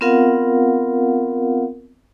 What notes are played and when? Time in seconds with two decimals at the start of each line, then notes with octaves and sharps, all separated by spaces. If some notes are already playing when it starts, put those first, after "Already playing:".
0.01 B3 C4 F4 A#4 F5 F#5